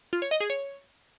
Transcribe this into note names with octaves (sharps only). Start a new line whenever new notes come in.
F4
C#5
D#5
G#4
C#5